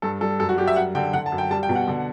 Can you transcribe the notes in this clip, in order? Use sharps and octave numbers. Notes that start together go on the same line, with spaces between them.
G2 A4
G3 A4
F#2 A4
F#4
G3 G4
E5
F#2 F#5
D3 G5
D3 F#5
A5
F#2
G5
G3 A5
G5
B2
F#5
D3